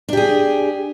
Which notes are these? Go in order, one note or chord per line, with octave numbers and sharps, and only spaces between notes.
D4 G4 G#4